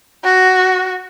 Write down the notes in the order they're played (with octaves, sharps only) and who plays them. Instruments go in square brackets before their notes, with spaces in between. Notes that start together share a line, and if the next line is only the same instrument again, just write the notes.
[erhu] F#4